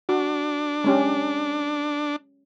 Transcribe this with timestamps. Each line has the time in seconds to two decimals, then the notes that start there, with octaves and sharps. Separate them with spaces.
0.09 D4 F#4
0.84 G#3 C#4 G4